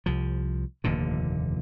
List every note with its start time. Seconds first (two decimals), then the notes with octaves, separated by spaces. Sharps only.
0.06 C2 F3
0.84 F1 D#2 A#2 D3